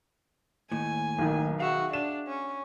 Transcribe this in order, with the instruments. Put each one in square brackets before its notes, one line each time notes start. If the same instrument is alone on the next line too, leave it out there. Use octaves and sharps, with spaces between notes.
[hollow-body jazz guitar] D#2 A2 [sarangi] G#5
[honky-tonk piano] B1 D#3
[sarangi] F#4 [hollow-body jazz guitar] G#4 E5 F5
[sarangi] D4 [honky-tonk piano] E7
[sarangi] C#4